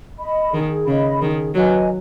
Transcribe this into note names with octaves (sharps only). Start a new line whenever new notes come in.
D#5 B5
D#3 G#4
C#3 D#5 B5
D#3 G#4
F#3 B4 D#5 G#5